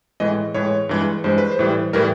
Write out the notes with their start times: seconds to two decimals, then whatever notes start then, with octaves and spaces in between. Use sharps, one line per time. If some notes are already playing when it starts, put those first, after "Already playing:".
0.20 A2 E3 G#3 D#5
0.54 A2 E3 G#3 C#5
0.89 G2 E3 G#3
1.24 G2 E3 G#3 C5
1.38 B4
1.52 C5
1.59 A2 E3 G3
1.93 A2 E3 G3 A#4